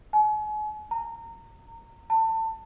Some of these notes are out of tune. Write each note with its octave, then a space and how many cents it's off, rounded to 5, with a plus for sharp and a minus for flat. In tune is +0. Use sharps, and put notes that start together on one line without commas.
G#5 +40
A#5 -25
A5 +25